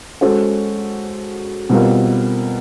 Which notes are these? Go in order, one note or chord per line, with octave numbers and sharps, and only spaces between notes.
G#3 C#4 F#4 A4 C5
B2 G3 C4 F4 A#4